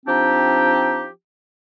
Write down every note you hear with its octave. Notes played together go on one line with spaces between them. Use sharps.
F3 C4 D4 D#4 G4